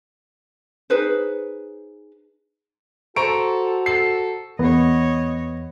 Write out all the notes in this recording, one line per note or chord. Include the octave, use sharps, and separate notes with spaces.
D#4 G#4 B4 C5
F#4 A4 C5 A#5 C#6 D7
A4 C7
E2 B3 C#5 D#5